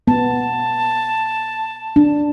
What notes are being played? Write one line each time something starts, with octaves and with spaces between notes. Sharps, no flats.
B3 A5
D4